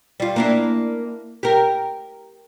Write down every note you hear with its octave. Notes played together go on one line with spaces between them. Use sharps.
G3 F4
A#3 D4 E4
G4 A#4